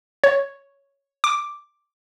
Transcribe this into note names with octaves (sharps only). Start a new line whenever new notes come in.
C#5
D6